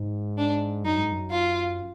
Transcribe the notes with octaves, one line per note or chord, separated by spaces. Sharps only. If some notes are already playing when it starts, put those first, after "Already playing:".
Already playing: G#2
D4
F#2 D#4
G#2
F#2
F4